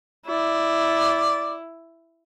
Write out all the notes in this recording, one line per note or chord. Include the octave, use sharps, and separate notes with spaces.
E4 D5